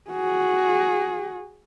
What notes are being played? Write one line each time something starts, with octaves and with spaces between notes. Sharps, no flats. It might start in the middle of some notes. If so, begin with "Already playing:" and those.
F#4 G#4